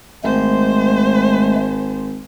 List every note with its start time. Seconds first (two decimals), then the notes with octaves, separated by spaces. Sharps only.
0.24 G#1 G#3 A3 C5